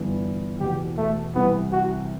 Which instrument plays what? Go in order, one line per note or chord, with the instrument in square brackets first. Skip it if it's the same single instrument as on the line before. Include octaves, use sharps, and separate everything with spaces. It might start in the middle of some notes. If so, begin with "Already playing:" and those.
Already playing: [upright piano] G1 G2 E3 B3 D4
[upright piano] E1 E2 B2 [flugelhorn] G4
[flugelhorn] A3
[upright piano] C2 C3 E3 [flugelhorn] B3
[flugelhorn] F#4